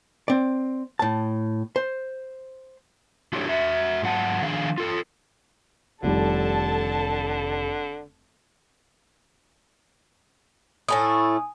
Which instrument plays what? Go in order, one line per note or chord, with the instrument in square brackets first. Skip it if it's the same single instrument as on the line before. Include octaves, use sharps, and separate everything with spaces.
[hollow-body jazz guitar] C4 D5
A2 A5
C5
[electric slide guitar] D4 E4 F#4 G4 A4 C#5
F#4 E5
G#2 F#3 F#5 A5
D#3 F3 D4 G#4 F5
F4 A4
[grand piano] F1 D#3 G3 [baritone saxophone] D3 [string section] A4 A5
[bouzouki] A2 A3 E4 [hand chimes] G#5 D#6